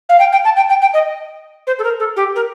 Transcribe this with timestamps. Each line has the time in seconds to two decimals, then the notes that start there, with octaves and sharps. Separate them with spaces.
0.09 F5
0.19 G5
0.32 G5
0.45 A5
0.56 G5
0.69 G5
0.82 G5
0.94 D#5
1.67 C5
1.79 A4
1.84 A#4
2.00 A4
2.16 G4
2.36 A#4